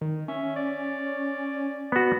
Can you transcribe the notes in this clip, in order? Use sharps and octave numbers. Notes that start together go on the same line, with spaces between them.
D#3
C#4 E5
D5
B3 F#4